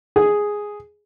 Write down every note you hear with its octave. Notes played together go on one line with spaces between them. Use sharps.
G#4